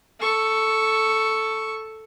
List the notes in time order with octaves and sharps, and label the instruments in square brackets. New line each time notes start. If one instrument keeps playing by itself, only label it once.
[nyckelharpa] A4 C#6